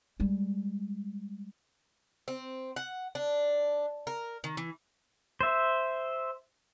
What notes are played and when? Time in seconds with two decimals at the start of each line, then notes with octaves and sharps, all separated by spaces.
0.20 G3 G#3
2.28 C4
2.76 F#5
3.15 D4
4.07 A#4
4.44 D#3
4.57 E3
5.41 C5 E5